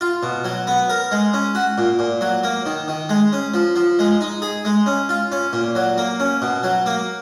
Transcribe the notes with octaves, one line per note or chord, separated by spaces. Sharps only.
F4
B2
F#3
B3
A#4
G#3
C#4
F#4
A#2
A#2
F#3
A#3
D#3
D#3
G#3
C#4
F3
F3
G#3
D#4
G#4
G#3
C#4
F4
C#4
A#2
F#3
A#3
C#4
B2
F#3
A#3